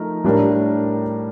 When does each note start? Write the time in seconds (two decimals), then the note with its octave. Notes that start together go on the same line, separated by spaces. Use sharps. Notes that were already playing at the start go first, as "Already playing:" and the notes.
Already playing: F3 A3 D#4 A#4
0.24 A2 G3 D4 G4 A#4